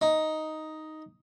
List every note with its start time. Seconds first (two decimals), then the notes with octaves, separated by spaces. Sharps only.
0.01 D#4